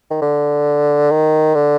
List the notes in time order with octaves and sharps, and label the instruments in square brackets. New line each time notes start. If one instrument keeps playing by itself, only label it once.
[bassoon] D#3
D3
D#3
D3